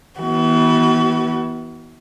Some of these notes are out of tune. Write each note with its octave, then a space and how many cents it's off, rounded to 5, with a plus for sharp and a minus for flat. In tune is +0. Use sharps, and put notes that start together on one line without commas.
E3 -25 B3 -30 F#4 +35